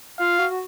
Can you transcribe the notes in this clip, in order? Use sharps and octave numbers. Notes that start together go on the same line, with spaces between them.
F4 F5
F#4
F#4